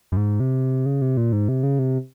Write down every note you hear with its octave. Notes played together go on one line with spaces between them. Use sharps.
F#2
G#2
C3
C#3
C3
A#2
G#2
C3
C#3
C3